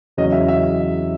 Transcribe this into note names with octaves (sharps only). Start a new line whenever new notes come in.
E2 C#3 F#3 C#4 D#5
E5
E5